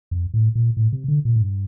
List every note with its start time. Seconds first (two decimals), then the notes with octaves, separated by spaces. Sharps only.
0.11 F2
0.34 A2
0.55 A#2
0.77 A2
0.93 C3
1.08 D3
1.25 A#2
1.36 A2
1.41 G2